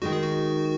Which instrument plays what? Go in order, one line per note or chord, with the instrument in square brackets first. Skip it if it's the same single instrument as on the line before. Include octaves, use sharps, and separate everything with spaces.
[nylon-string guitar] D#3 G#3 D#4 [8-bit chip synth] F#4
[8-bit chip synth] G#4
F#4